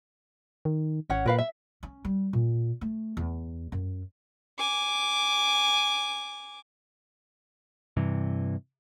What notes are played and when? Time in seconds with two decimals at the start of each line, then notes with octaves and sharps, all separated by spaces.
0.65 D#3
1.10 G#1 C#4 C#5 F#5
1.26 A#2 A#4 B4 F5
1.38 E5
1.83 C#4
2.05 G3
2.33 A#2
2.81 A3
3.17 E2
3.72 F#2
4.59 G#5 D6
7.97 G2 C3 E3